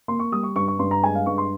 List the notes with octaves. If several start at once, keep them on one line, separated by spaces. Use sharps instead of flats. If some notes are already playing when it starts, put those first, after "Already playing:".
A#3 C6
C#6
G3 D#6
C#6
G2 C#6
C#6
G2 C6
A#5
G#3 G#5
F5
G2 C#6
C6